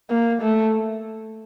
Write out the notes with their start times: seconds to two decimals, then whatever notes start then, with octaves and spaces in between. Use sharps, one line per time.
0.10 A#3
0.41 A3